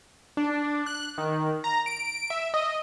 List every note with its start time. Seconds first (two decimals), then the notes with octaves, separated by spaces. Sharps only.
0.37 D4
0.86 F#6
1.18 D#3
1.64 A#5
1.86 D7
2.30 E5
2.54 D#5